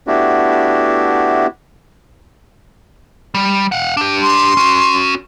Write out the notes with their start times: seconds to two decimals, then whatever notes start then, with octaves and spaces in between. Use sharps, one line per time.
0.07 A3 B3 D4 E4 F#4 G4
3.35 G3
3.72 F5 F#5
3.97 D4 G4
4.22 C6
4.57 C#4 F#4